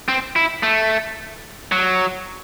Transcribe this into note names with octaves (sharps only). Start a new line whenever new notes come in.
C4
E4
A3
F#3